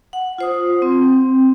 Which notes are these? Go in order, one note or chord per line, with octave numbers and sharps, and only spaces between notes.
F#5
F4 C5 D#6
C4